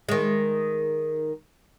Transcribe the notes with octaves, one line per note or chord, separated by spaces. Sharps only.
D#3 G#3